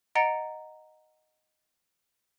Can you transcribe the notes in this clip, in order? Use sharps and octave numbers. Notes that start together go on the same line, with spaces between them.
D#5 F#5 A#5 A6 C#7 D7